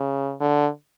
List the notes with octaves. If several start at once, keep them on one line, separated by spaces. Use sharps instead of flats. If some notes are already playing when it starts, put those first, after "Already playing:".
Already playing: C#3
D3